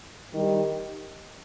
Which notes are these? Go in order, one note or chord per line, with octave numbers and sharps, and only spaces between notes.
D#3 G3 D#4 G4